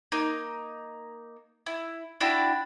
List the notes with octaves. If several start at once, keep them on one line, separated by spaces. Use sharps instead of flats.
A#3 D#4
E4
D4 E4 F#4 G5